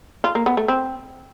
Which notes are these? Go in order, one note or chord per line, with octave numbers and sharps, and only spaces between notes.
F4
A#3
B3
A3
C4